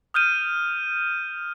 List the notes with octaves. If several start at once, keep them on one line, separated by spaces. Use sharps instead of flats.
D#6 F6 G6 D#7